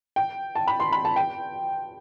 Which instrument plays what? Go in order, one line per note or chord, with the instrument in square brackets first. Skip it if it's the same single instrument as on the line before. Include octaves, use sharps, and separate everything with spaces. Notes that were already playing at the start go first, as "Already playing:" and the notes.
[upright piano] G5
A5
B5
C6
B5
A5
G5